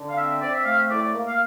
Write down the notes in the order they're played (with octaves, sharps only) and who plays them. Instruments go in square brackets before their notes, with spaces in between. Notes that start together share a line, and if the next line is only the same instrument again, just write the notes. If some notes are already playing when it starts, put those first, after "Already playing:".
Already playing: [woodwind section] D3
F5
C4 E5
C4 D5
E5
A3 F5
E5
A2 D5
D5
A#3
F5